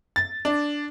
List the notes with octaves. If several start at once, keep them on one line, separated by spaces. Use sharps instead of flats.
A6
D4